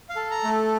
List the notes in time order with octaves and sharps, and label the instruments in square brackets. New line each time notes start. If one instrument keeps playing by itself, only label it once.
[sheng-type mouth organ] F5
A4
A#5
A3